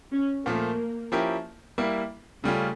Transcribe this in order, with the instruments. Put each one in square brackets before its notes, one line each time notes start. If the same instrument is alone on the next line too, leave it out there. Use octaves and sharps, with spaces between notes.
[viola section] C#4
[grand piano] A#2 F3 A3 [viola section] A#3
[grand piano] F3 C#4 E4 G4 A#4
G3 A#3 E4
[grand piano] C#3 G3 C#4 F4 [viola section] A3